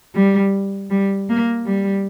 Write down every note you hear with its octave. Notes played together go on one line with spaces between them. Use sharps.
G3
G3
A#3
G3